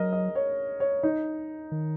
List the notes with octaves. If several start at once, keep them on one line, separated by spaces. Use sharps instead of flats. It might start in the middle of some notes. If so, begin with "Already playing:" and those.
Already playing: F#3 A#4 D#5
D#5
C#5
C#5
D#4
D#3